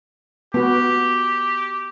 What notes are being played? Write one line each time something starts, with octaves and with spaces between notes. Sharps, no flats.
B3 F#4 G4